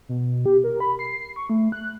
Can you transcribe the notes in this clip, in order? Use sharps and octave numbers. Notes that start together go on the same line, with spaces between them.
B2
G4
A#4
B5
C7
C#6
A3
F#6